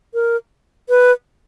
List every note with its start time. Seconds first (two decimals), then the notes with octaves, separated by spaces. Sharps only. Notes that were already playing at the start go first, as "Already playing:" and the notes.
0.14 A#4
0.89 B4